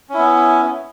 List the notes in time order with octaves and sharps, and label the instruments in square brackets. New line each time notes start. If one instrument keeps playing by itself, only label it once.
[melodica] C#4
E4
B3